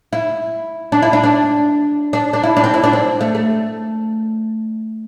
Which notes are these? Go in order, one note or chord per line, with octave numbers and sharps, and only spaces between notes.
E4
D4
E4
D4
D4
D4
D4
E4
D4
C4
E4
D4
C4
A3
A3